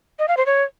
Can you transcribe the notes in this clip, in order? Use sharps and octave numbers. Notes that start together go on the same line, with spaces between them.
D#5
F5
C5
C#5